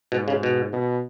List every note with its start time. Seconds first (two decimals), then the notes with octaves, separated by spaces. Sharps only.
0.12 G#2 B2
0.28 C#3
0.43 B2
0.73 B2